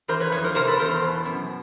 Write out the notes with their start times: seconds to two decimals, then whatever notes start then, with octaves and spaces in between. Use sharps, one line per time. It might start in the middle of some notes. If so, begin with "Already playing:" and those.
0.08 E3 A#4 C5
0.20 B4 C#5
0.32 F2 B4 C#5
0.44 A#4 C5
0.55 C3 A#4 C5
0.67 A4 B4
0.79 E2 A#4 C5
1.02 B2
1.25 F#2